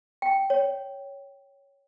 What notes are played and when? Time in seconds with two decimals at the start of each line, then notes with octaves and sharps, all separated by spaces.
0.22 G5
0.50 C#5